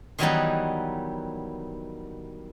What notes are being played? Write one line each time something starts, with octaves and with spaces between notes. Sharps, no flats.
D#3 E3 F#3 G3 B3 D#4